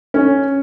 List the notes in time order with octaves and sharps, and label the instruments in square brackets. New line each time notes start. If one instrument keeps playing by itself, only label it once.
[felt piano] C#4